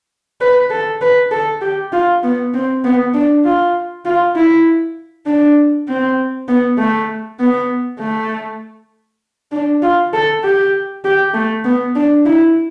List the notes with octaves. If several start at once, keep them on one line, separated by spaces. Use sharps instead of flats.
B4
A4
B4
A4
G4
F4
B3
C4
B3
D4
F4
F4
E4
D4
C4
B3
A3
B3
A3
D4
F4
A4
G4
G4
A3
B3
D4
E4